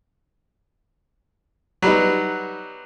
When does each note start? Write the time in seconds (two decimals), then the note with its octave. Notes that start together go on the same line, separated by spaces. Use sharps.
1.82 F#3 G3 B3 D#4